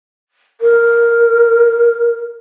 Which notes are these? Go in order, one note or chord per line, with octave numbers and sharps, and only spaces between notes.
A#4